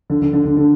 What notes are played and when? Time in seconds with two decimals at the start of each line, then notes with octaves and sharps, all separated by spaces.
0.10 D3
0.22 D3
0.33 D3
0.45 D3
0.57 D3